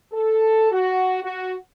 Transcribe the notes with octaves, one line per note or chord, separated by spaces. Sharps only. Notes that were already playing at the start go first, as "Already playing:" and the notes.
A4
F#4
F#4